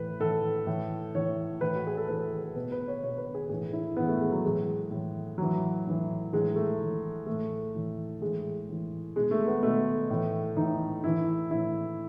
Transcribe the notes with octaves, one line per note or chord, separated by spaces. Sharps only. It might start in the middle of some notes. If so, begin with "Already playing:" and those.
Already playing: A2 E3 B4
A2 E3 A4
A2 E3
A2 E3 C#5
A2 E3 B4
F#4
G#4
A4
A2 E3 B4
B2 B4
B4
C#5
B2 C#5
B4
G#4
A2 E3 G#4
E4
A2 E3 B3
A3
G#3
F#3
A2 E3 G#3
A2 E3
A2 E3 F#3
A2 E3
A2 E3 G#3
A3
A2 E3
A2 E3 A3
A2 E3
A2 E3 G#3
A2 E3
B2 G#3
A3
B3
B2 A3
A2 E3
A2 E3 D#4
A2 E3 E4
A2 E3 E4